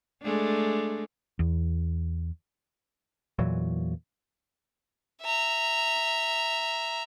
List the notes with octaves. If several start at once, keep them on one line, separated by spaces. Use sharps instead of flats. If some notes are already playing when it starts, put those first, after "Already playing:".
G#3 A3 D4
E2
E2 A#2 E3 F#3
E5 A#5